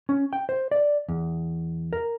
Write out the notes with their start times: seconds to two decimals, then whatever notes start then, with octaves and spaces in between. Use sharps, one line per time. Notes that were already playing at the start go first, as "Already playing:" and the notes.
0.09 C#4
0.33 G5
0.49 C5
0.71 D5
1.09 E2
1.93 A#4